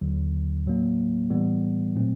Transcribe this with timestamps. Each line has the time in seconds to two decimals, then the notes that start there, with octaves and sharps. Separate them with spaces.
0.01 D#2 D3 F#3
0.66 A2 F#3 A#3
1.30 A2 E3 G3 B3
1.95 A#2 F#3 A3 C4